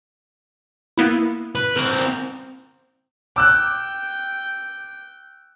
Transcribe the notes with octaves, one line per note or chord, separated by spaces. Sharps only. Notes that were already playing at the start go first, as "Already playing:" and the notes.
A#3 B3 E4
B4
C4 A#4
G5 D6 E6 F#6